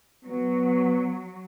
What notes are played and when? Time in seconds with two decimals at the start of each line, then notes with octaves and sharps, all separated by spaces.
0.25 F#3 B3